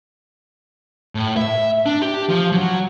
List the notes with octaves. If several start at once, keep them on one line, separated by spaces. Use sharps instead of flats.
A2
E5
D4
G4
F3
F#3